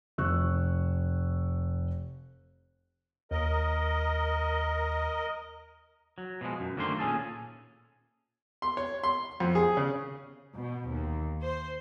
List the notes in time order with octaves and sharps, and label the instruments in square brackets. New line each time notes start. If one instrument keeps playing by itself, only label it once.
[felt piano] F1 C#6 E6 F#6
[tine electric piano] D#2 [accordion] A#4 D#5
[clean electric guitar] F#3
B2 F3 G#3
F#2
D3 D#3 A3 A#3 C5 C6
A#2 C#4 G#4 A4
[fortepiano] C6
C#5
C6
F2
G#4
C#3
[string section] B2
D#2
C5